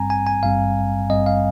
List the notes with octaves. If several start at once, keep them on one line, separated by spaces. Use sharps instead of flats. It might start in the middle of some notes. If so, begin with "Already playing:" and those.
Already playing: G#1 G2 G3 C4 G#5 A#5
G#5
G#5
G#1 G2 G3 C4 F5
G#1 G2 G3 C4 D#5
F5